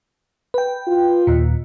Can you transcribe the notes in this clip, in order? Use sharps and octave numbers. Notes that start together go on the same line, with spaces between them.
B4 G5
F4
D#2 A#2